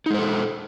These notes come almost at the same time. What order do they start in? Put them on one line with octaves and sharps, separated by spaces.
D#4 G#3 C5 A4